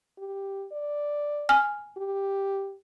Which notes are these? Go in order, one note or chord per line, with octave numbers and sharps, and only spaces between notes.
G4
D5
G#5 F6
G4